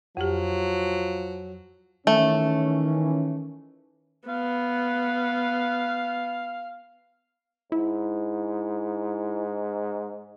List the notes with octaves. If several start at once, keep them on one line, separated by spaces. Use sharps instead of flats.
F2 F3 F#3 G4
D#3 E3 A3 C#4
B3 F5
G#2 E4